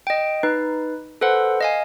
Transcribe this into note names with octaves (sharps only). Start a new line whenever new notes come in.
D#5 G5
D#4 B4
A4 B4 C5 F#5
D#5 F5 G#5